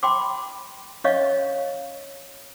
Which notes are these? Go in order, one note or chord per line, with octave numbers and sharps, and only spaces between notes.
G5 B5 C6 D6
C#4 C#5 D#5 F5 C#6